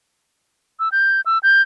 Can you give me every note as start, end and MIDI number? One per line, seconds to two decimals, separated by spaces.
0.80 0.89 88
0.92 1.21 91
1.26 1.38 88
1.43 1.62 91